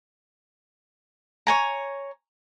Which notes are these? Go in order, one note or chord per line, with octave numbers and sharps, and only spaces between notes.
C#5 G#5 A#5